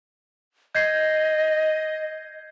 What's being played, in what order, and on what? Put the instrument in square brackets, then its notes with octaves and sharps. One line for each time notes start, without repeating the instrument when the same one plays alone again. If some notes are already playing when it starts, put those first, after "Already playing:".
[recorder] D#5 [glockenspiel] G6 G#6 C7